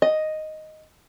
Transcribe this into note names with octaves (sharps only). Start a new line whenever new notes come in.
D#5